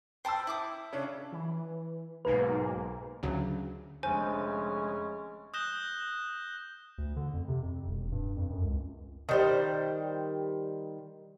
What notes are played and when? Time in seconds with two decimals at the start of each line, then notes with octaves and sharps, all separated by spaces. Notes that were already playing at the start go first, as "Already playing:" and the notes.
0.25 C5 G5 A5 B5 E6
0.47 E4 D6 D#6
0.93 C#3 C#4 D4
1.32 E3
2.25 B1 G#2 A#3 B4
3.23 D2 C#3 F#3
4.03 F1 D3 G#3 C#4 C5 G#5
5.54 D#6 F#6 G6 A#6 E7 G7
6.98 D2
7.16 D3
7.33 F2
7.48 C3
7.62 F2
7.87 E1
8.12 G2
8.36 F2
8.50 F#2
8.63 C#2
9.29 D#3 G3 C5